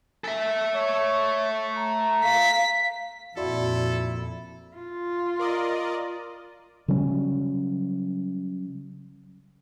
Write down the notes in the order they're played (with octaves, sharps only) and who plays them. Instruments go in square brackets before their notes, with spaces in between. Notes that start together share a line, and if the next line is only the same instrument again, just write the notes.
[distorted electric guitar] A4 E5
[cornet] C#5
A#5
[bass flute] F5 [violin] B6
[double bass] F2 A#2 [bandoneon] E4 [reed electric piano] F#4 D5 C6 [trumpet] A4
[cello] F4
[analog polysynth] A#4 D5 D#5
[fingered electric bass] C#3 F#3 G3 C#4